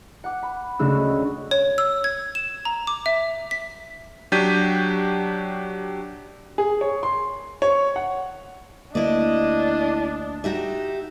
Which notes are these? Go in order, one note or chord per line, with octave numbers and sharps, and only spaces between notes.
F#5 D6
B5
D2 C#3 G#3 C#4 E6 F#6
C#5
E6
G#6
E7
A#5
D6
E5
B6
F#3 D4 G4 G6 B6 D#7
G#4
C#5
C6
C#5
F#5
D2 A#3 D4 E4 D5 D#5
D#4 F#4 G4 E5